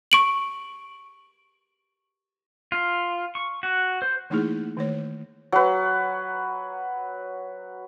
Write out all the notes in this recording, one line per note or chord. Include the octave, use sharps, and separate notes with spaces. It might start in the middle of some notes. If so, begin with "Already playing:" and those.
C#6 D7 F#7
F4
C#6
F#4
C5
E3 A3 A#3 D#4 E4 G#4
D#3 A3 C#5
F#3 B4